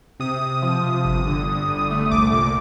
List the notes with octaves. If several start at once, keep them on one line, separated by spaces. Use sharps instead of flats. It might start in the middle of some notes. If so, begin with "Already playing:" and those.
C3 D#6
C3
F3
C3
G1
D3
D3
G1
A3 D#6
C2 D6
A#2 D6